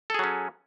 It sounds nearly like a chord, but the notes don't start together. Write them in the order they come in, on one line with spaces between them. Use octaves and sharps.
A4 G#4 F#3 C#4